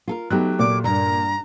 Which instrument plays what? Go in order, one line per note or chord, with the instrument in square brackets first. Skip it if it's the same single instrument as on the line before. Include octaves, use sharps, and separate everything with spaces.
[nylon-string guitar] F4 A4 A#4
[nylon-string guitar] F#3 A3 G4 [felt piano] B3 D#4 F#6
[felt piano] A#2 [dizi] D6
[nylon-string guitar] E2 G2 [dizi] A#5